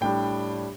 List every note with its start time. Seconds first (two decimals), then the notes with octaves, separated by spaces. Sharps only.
0.01 A2 G3 D4 G5